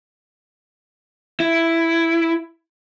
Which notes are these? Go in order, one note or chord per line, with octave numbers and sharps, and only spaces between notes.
E4